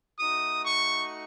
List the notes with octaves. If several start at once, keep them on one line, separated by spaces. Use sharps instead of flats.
A3 D#4 F#4 D#6
C#6